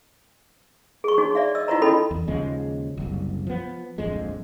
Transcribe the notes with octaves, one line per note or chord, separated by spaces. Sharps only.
G#4 C#6
D4 D#4 F#4 G#4 C#5
C#5 D5 E5 F5
D#5 E6
D#4 F4 F#4 C#5 A#5
C#4 E4 A4 D#5 G5 B5
E2
D#2 C#3 F3 G#3
F#1 C2
F3 B3
D1 A#1 F2 G#3